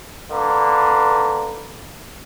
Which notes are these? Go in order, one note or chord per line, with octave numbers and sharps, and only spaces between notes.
D3 A#3 B4